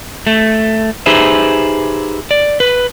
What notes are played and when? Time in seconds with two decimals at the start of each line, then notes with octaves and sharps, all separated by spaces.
0.27 A3
1.06 D#4 G4 G#4 B4 C5 E5
2.31 D5
2.60 B4